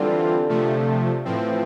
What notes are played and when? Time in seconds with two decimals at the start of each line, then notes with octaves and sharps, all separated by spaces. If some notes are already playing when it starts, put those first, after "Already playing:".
Already playing: D3 E3 G3 C4 F4
0.49 C3 F3 A3
1.25 A2 E3 F3 C4